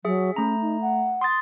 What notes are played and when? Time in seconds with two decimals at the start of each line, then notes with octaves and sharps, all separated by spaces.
0.05 F#3 G#4 E5
0.36 A3 C#4 A#5
0.62 D#4
0.81 F#5
1.21 C6 D#6 A6